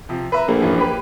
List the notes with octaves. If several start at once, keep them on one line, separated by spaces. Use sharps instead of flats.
C3 F3
B4 E5 A#5
A#1 A3 A#3
F#2 E3 F3
A#3 G4 B4